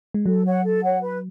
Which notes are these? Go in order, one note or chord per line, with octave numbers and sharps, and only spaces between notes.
G#3
F#3 A4
C#5 F#5
A4
C#5 F#5
B4